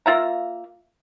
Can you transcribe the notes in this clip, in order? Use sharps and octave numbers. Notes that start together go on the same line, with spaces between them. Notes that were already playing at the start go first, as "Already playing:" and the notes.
A#3 F4 E5 A#5